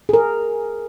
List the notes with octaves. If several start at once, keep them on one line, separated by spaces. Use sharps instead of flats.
G#4 A#4